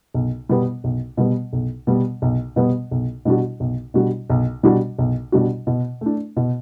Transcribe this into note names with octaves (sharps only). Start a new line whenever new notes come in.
B1
B2 G3 B3
B1
B2 G3 B3
B1
B2 G3 B3
B1
B2 G3 B3
B1
B2 G3 D4 F#4
B1
B2 G3 D4 F#4
B1
B2 G3 D4 F#4
B1
B2 G3 D4 F#4
B2
A3 D4
B2